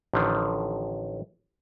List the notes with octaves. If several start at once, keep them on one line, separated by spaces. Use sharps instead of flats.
A1 D3 D#3 F3